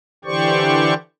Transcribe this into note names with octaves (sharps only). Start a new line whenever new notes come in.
D3 E3 G4 C5 D5 C#6